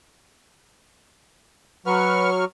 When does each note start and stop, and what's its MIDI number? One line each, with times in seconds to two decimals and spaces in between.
1.86 2.45 54
1.86 2.30 71
1.86 2.30 78
1.86 2.45 85
1.86 2.45 89